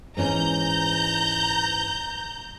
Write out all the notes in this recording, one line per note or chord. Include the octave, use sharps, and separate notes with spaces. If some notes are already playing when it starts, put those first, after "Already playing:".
G#2 E3 C#4 A#5 G6